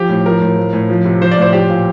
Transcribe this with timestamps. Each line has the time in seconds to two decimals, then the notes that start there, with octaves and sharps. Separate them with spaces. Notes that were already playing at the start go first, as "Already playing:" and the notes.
Already playing: F3 G4
0.09 A2
0.26 F3 A#4
0.41 A2
0.57 F3
0.73 A2
0.89 F3
1.05 C3
1.21 F3 C5
1.31 D5
1.37 A2 C5
1.53 F3 G4
1.69 A#2